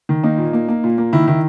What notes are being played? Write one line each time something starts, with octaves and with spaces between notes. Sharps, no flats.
D#3
A#3 D#4
A#2
A#3
A#3
A#2
A#3
D#3 E4
D#3 E4